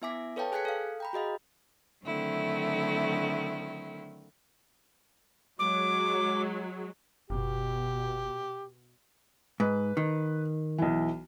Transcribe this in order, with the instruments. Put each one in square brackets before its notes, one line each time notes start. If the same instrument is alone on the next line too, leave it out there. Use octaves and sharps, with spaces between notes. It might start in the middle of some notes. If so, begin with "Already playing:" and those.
[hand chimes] B3 E4 E5 G#5 D6 B6
A4 B4 C#5 F5 G5 A5
G#4 G#5 F#6 G#6 B6 C#7
A4 F5
G5 A#5 B5
F#4 G#4 D#5 F5
[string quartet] D3 D#3 F#3 A3 C4 E4
[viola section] F#3 G#3 [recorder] D6
[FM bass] F#1 [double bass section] B2 [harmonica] G4
[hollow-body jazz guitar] G#2 [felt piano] B4
[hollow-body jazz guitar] D#3
[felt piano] B1 E3